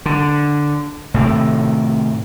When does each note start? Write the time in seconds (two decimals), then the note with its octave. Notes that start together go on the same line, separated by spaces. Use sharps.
0.06 D3
1.14 A2 C3 D#3